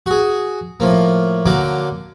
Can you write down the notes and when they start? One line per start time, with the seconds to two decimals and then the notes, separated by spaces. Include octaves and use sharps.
0.06 F#4 G#4
0.80 A2 F3 A#3
1.46 D3 F#3 A#3 D6